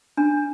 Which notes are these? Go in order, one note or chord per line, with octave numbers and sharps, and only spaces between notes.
D4